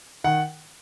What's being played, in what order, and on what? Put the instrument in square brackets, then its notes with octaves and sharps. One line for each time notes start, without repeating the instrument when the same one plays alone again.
[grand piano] D#3 F#5